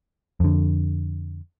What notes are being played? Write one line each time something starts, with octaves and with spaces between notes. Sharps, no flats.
F2 D3